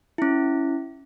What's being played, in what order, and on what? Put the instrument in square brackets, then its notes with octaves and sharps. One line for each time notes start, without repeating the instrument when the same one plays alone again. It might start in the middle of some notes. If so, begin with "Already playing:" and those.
[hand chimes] C#4 E4